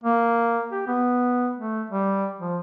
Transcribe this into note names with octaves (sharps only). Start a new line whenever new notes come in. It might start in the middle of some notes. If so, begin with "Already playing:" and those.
A#3
G4
B3
A3
G3
F3